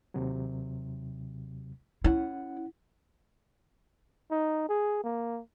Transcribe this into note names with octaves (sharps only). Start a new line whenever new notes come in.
D#2 C3 F#3
C#4 E4 F#5
D#4
G#4
A#3